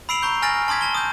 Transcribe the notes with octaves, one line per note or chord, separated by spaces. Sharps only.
B5 E6 C7 D7 F7 F#7
A#5 C#6 G6
G#5 F6 A6 A#6 D7 F#7
A5 C6 D#6 G#6 B6
A5 G7
D#6 G6